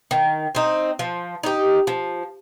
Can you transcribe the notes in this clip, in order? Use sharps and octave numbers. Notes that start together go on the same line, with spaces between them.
D#3
C4 D#4
F3
D#4 G4
F3